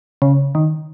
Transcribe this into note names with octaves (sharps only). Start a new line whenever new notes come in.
C#3
D#3